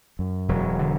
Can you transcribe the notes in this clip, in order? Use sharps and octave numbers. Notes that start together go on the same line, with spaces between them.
F#2
E1 F#3
D3